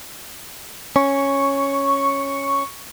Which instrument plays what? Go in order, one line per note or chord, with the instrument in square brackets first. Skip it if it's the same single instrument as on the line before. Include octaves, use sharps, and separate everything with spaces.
[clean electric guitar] C#4 [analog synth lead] C#6